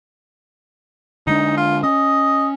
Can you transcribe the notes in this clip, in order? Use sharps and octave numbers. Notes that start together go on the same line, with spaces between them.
D3 G#3 D4 D#4
F4
C#4 D#5